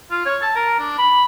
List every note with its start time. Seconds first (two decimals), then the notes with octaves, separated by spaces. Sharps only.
0.11 F4
0.26 C#5
0.42 A5
0.56 A#4
0.79 D4
0.98 B5